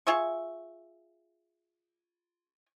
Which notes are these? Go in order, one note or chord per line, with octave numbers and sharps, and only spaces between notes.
F4 G#4 E5 C#6